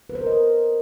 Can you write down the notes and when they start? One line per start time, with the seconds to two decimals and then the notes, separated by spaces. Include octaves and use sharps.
0.10 B4
0.15 C5
0.21 A#4
0.27 D#5
0.32 A#4